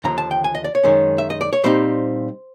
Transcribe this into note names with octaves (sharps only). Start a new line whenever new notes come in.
D#2 D3 F3 A#5
A5
G5
G#5
D#5
D5
C#5
F#2 D#3 G#3 C#4
E5
D#5
D5
C#5
A#2 G3 C4 D#4 C5